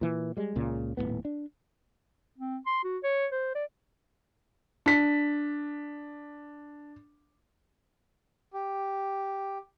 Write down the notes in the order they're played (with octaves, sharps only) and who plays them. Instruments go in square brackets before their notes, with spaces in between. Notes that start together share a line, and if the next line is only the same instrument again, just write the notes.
[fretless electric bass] A#2 E3
G3 G#3
C#2 A#2 C#3
D#1 E2 A2 B3
D4
[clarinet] C4
C6
F#4
C#5
C5
D5
[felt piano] D4 B6
[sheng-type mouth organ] G4